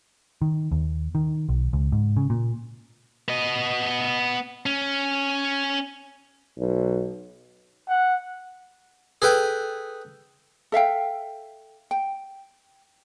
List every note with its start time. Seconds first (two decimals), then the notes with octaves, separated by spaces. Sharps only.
0.42 D#3
0.72 D#2
1.15 D#3
1.49 B1
1.73 C#2
1.92 G#2
2.17 C#3
2.30 A#2
3.28 B3 D#5
4.66 C#4
6.58 B1
7.88 F#5
9.22 G#4 A4 B4 G5
10.72 A4 E5 F5 G5
11.91 G5